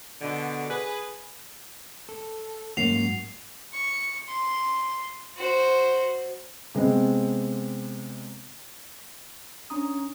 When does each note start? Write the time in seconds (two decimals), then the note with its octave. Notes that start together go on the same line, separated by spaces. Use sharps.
0.21 B2 D3
0.69 G#4 B4
2.09 A4
2.77 G#2 F#3 A#3 C#4 F#4 C7 F7
3.73 C#6
4.28 C6
5.37 F#4 C5
6.75 C3 G#3 B3 C4
9.70 C#4 D4 A#5 D#6